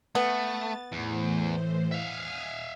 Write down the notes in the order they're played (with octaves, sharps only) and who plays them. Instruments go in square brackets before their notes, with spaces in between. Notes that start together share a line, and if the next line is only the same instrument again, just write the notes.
[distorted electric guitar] A3 [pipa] B3 [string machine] A6
[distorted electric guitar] E2 [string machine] A2 E3 C5
[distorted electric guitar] E5 F5 [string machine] G#5 D#6 F6